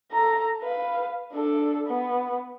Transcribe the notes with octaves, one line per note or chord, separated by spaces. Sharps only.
A4 A#5
B4 F5
D4 A4
B3